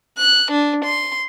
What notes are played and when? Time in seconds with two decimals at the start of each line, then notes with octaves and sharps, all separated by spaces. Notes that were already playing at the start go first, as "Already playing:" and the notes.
0.18 F#6
0.51 D4
0.85 C6